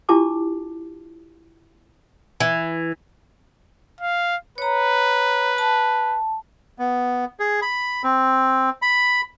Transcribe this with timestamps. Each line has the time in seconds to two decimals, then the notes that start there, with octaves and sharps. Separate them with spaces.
0.09 D4 E4 F4 G4 A5 D6
2.40 E3
4.01 F5
4.58 B4 C#5 A#5
5.58 A5
6.79 B3
7.40 G#4
7.62 B5
8.04 C4
8.82 B5